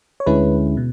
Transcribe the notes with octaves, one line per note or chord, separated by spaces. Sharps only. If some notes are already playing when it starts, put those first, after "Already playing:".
C#5
D2 D3 G#3 C#4 E4 B4
B2